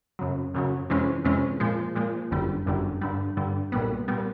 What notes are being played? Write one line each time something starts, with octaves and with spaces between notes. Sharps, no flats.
F#2 C#3 F#3
F#2 C#3 F#3
F2 C3 E3 G#3 C#4
F2 C3 E3 G#3 C#4
A#2 F3 G#3
A#2 F3 G#3
G1 F#2 D3 G3
G1 F#2 D3 G3
G2 D3 G3
G2 D3 G3
B1 A#2 G3 B3
A#2 G3 B3